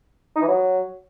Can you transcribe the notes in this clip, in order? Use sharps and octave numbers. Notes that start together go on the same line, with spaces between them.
D#4
E3
F#3